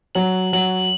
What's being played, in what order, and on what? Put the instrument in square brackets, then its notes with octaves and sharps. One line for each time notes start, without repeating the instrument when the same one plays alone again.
[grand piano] F#3 [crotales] F#7
[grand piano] F#3 [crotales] F#7